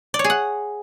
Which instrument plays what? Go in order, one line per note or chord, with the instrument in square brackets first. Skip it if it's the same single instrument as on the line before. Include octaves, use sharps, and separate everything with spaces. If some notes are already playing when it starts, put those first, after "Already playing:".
[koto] D5
C#5
G#4
F#5